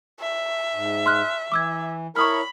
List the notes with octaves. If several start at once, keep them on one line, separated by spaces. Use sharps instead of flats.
E5
G#2
C6 F6 F#6
E3 D6 E6 G#6
E4 A#4 C#5 B5 C#6 D#6 F6